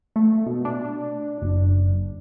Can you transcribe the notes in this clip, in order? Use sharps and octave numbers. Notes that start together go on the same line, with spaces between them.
A3
B2
D4
F#1